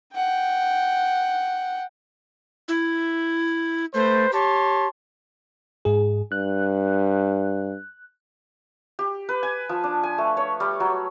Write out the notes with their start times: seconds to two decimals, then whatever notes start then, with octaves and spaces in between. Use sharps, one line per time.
0.15 F#5 G5
2.68 E4
3.94 A3 B4 C5
4.32 G4 C#5 A5 C6
5.85 G#2 G#4
6.32 G2 F#6
8.99 G4
9.29 B4
9.43 G#5
9.69 F3
9.84 D4
10.03 G#5
10.18 A3
10.37 C#5
10.60 G3
10.80 F#3